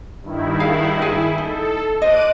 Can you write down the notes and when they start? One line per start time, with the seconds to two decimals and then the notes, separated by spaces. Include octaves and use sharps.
0.22 G2 D#3 E4
0.60 G#4 F5
1.02 E4 G#4 G#5
1.38 D#4 A4
2.02 C5 D#5 D6 F#6 D#7